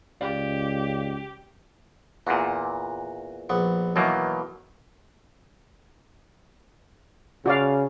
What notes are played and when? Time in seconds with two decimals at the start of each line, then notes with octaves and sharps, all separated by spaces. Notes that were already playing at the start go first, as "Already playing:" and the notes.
0.21 C#2 G4 D5 F5
2.27 E2 A#2 F#4
3.49 A#1 B3 C#6
3.96 B2 D#3 E3 F#3 A#3
7.46 C#3 F#4 D5 F5